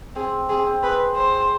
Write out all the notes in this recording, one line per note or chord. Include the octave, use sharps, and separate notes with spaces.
C4 G#4
C4 G#4
C4
G#4 B4
C5